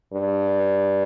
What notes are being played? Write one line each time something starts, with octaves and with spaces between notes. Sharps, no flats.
G2